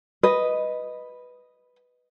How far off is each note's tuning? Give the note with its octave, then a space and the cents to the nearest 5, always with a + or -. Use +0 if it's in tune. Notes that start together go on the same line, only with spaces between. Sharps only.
B4 +0 D#5 +0